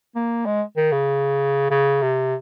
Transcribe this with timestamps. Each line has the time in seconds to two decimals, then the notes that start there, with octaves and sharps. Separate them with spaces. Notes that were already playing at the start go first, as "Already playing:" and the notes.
0.16 A#3
0.46 G#3
0.77 D#3
0.92 C#3
1.70 C#3
2.02 C3